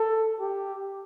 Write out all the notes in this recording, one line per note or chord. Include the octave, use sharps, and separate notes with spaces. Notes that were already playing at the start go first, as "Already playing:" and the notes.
Already playing: A4
G4